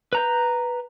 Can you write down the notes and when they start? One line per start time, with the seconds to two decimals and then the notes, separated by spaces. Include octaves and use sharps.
0.13 B4 A#5 G6